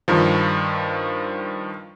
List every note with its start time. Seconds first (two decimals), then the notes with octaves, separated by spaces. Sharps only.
0.08 G2 D#3 F3